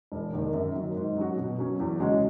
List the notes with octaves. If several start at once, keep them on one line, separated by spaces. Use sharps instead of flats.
E1
D#2 D#3
F#2
D#3 F#3
G#2
F#3 C#4 F#4
B2
F#3 C#4
E2
C#3 G#3 C#4 F#4